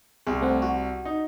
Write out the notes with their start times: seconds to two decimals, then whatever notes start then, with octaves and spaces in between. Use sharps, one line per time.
0.27 C2 G4 G#4
0.41 A3 C4 F#5
0.62 F#4
1.05 D#4